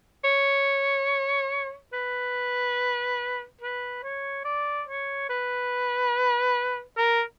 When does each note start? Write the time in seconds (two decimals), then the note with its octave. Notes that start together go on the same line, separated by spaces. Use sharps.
0.24 C#5
1.93 B4
3.61 B4
4.04 C#5
4.45 D5
4.87 C#5
5.30 B4
6.97 A#4